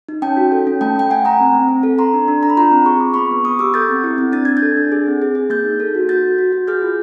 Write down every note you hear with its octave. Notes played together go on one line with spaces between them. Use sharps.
D#4
C#4 G5 A5
F#4
A4
C#4
A3 G5 A5
A3 G5
A3 F#5 G#5
A3 G#5 A#5
C4
C4
C4
A4
A4 A#5 C6
D4
D4
D4 A#5
B5
F4 A#5 C6
C4
G#4 C#6
F4 D6
B3 B5 C#6
B3
B3 C#6 D#6
G4 D6 E6
A4 G6 A6
C4
E4
C4
D4 A6
D4 G#6
G6 A6
A4
D4
G#4
C4
G#4
G#4
A#3 G6 A6
D#4
A4
F#4
F#4 G6 A6
F#4
F#4
F#4
G#4 F6 G6
F4